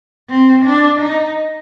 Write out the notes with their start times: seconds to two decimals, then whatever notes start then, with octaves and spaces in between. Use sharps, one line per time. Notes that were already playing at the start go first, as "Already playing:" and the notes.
0.30 C4
0.65 D4
1.00 D#4